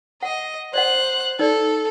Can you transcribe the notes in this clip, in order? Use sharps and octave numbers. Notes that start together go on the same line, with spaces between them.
D#5 F#5
C5 D5 D#5 F#5 F#6
D#4 A4 D5